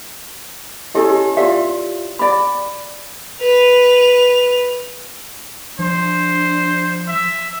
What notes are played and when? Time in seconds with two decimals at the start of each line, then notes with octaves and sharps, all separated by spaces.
0.95 C#4 E4 G4 A4 C#5 D#5
1.10 G4
1.37 F4 G4 D5 E5 F5
2.19 G4 D5 B5
3.40 B4 F7
5.79 F3 D4 C5
7.08 E5